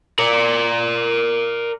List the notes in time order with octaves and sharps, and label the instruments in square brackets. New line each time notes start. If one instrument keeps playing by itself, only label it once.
[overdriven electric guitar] A#4 D5